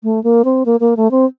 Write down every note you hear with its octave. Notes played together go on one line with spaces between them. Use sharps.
A3
A#3
C4
A#3
A#3
A3
C4